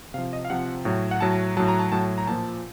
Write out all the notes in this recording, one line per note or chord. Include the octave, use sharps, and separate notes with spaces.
C3 F3 F5
D#5
F5
C3 F3 F#5
A2 F#3
F#5
A2 F#3 A5
A2 F#3 A5
A#5
A5
A2 F#3 A5
A#5
A#2 F3 A5